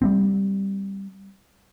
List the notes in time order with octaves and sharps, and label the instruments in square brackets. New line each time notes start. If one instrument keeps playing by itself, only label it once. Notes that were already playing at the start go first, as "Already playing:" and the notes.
[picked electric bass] G3 B3 C4